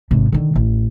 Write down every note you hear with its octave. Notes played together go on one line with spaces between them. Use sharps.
G#1 C3
D3 D#3
A1